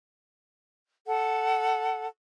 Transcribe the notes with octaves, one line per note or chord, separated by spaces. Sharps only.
A4 F#5